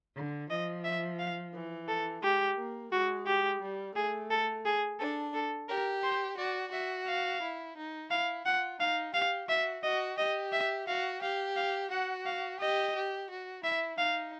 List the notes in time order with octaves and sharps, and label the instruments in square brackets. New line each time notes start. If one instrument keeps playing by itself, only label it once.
[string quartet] D3
[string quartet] F3 [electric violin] D#5
[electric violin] E5
F5
[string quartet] E3
[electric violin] A4
[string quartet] G#3 [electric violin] G4
[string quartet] A#3
[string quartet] G#3 [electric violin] F#4
[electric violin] G4
[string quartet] G3
[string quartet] A3 [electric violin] G#4
[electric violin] A4
G#4
[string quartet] D4 [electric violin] A4
[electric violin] A4
[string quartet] G4 [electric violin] A#4
[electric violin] C5
[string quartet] F#4 [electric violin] D5
[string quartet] F#4 [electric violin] E5
[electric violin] F5
[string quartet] E4
D#4
[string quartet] E4 [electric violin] F5
[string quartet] F4 [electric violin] F#5
[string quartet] D#4 [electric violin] F5
[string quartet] G4 [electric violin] F5
[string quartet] F#4 [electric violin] E5
[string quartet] F#4 [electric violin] D#5
[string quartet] G4 [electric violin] D#5
[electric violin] E5
[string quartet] F#4 [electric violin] F5
[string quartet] G4 [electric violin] F5
[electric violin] F5
[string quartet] F#4 [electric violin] F#5
[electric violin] F5
[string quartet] G4 [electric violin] D#5
[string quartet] G4
F#4
[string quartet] E4 [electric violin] E5
[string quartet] D#4 [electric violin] F5